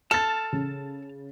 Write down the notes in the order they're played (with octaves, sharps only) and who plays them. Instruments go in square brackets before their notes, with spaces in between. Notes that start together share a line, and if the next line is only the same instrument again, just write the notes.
[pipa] A4 [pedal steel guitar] A5 F6 [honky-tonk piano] A6 E7
[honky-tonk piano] C#3